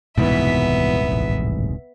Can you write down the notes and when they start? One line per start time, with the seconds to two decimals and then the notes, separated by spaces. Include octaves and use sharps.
0.18 D#1 C2 G#2 B2 E3 B3 E5
1.12 A1